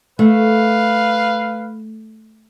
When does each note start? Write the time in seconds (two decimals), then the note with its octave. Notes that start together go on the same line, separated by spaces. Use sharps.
0.19 A3 B4 F5